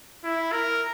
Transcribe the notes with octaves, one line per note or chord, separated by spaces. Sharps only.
E4
A#4